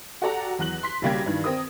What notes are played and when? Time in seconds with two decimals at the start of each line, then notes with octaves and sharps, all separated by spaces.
0.22 F#4 G4 A4 D5 A#5
0.59 E2 F#3 F#6 F#7
0.83 C6 B6
1.02 B1 C#3 G3 A#3 G5 G#6
1.26 G2 D#3 E3
1.44 C4 A#4 D#6